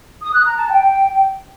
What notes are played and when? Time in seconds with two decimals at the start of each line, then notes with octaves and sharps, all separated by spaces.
0.23 D#6
0.34 F#6
0.46 A#5
0.57 A5
0.69 G5